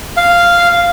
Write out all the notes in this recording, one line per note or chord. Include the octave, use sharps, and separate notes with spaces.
F5